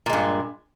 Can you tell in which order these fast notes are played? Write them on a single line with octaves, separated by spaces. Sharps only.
A#2 G#3 G2